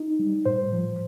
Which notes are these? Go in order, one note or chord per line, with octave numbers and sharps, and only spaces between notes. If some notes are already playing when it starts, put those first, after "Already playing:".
Already playing: D#4
G3
A2 C5
F3